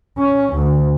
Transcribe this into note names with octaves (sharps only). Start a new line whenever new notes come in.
C#4
D2